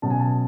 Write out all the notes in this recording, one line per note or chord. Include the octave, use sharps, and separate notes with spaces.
B2 F#3 C#4 A5
G#5
A5